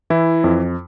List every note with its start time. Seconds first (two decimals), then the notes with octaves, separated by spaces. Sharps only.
0.10 E3 E4
0.44 F2